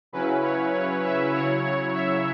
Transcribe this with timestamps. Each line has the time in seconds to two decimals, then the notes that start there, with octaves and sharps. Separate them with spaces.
0.12 C#3 F#3 C#4 E4 B4
0.43 C#5
0.73 C#5
1.03 E5
1.34 C#3 F#3 E4 C#5
1.64 C#5
1.95 E5